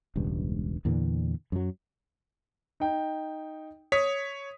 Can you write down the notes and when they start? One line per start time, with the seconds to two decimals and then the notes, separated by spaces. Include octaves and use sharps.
0.16 E1 C#2 G2
0.85 E2 A#2 D3 E3
1.52 F#2 F#3
2.80 D#4 G5
3.92 C#5 D#6 B6